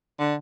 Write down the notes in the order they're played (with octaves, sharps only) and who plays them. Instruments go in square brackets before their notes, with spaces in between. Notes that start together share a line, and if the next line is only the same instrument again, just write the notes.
[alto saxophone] D3